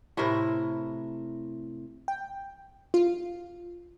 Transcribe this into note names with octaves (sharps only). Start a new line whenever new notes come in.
A2 C3 E4 A#4
G5
F4